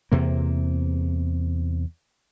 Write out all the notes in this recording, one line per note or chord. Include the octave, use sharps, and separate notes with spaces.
E2 C3 A#3